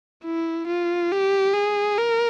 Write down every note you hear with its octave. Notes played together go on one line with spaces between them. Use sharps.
E4
F4
G4
G#4
A#4